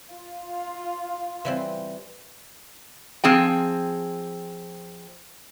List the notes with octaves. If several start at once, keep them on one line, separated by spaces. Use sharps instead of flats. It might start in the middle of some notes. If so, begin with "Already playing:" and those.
F4
E3 G3 C4
F3 C4 G#4 G5